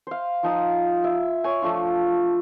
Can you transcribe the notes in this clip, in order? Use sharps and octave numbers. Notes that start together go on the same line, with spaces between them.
C5 F5
F3 D#4 D#6
E5
C#5 G#5
F3 A3 D4 F4